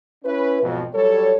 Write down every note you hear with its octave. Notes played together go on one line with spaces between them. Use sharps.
C#4 E4 B4
B1 F2 G#2 B2
F#3 G3 A4 C#5